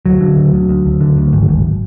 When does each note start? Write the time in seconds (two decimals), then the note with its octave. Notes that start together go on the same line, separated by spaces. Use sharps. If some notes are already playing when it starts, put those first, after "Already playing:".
0.06 D2 F#3
0.21 D3
0.37 D2
0.54 D2
0.69 D2
0.86 D2
1.01 D3
1.17 D2
1.33 G#1
1.49 G#1